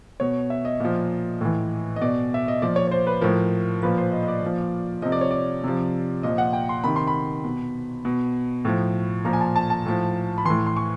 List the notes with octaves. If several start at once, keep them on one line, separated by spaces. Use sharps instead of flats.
B2 C#5
E5
D#5
A#2 F3
A2 E3
D#5
B2 D5
E5
D#5
A#2 F3 D5
C#5
C#5
C5
B4
A2 F3 A#4
A#2 F3 B4
C5
D#5
D#5
D5
A#2 F3
C3 F3 D#5
D5
C#5
D5
C3 F3
A#2 F3 D#5
F#5
G5
C6
C3 D#3 B5
C6
B5
B2
B2
A2 F3
A#2 F3 A#5
G#5
A5
A5
A5
A2 F3
B5
A2 E3 C6
C6
C#6